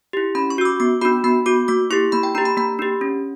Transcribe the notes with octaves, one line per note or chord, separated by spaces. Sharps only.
E4 G4
C#4 B5
C#6
F#4 E6
D6
B3 D6
D4 F#4 B5
B3 B5
F#4 D6
A#3 D6
E4 G4 C#6
A#3 B5
G5
D4 G4 A#5
B5
A#3 B5
D4 G4
C#4